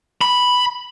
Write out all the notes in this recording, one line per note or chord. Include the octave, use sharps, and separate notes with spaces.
B5